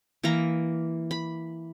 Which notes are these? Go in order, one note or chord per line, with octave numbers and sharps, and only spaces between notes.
E3 A#3 A#5
B5